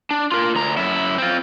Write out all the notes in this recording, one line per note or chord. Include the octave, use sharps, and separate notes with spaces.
D4
F4 A#4
D2 A#5
F#2 E4
C4 F4